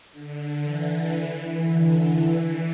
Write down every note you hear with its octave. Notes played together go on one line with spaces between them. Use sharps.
D3
E3
D3
E3